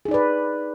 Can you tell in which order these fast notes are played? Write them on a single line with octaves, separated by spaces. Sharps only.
G#4 D#4 D5 B4